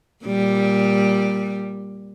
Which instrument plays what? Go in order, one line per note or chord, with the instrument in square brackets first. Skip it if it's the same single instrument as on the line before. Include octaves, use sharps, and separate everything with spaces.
[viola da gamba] A#2 G3